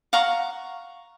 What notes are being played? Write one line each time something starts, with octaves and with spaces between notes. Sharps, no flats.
F5 F#5 A#5 C#6